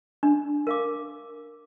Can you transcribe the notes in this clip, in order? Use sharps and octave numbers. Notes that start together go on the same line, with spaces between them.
D4
A#4 F5 D6